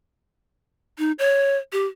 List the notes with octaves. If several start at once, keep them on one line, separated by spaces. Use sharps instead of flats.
D#4
C#5
G4